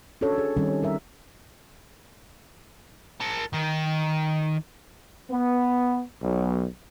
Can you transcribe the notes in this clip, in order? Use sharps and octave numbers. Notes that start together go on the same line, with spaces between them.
C#4 D4 F#4 A4 C#5
G#4
D#3 G3 C4 C#4 D#4
G3 A#4 E5
A#4 A5
D#3
B3
B1